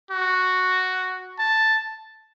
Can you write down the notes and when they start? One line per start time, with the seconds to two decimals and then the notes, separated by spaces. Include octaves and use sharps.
0.11 F#4
1.39 A5